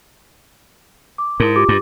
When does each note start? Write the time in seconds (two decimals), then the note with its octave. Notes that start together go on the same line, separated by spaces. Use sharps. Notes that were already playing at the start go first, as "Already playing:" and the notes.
1.18 D6
1.40 G#2 E4 A#4
1.56 F4 G4 D6
1.69 G2